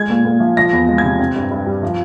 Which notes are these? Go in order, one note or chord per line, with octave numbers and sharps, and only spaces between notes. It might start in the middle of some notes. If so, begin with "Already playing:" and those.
Already playing: G#3 G#6
A#2
A#2
F3
F3 A#6
E2
G#3
G#6
C3
C4
G2
G2
G3
F3